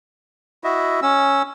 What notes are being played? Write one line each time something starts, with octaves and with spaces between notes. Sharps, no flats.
E4 F#4 D#5 E5
C#4 E6